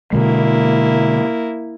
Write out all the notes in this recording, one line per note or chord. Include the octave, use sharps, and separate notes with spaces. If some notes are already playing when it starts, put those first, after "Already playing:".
B2 D3 G#3 A#3 E4